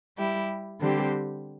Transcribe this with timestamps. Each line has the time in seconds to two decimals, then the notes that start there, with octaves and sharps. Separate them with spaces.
0.17 G3 E4 G4
0.80 D3 G3 C4 G4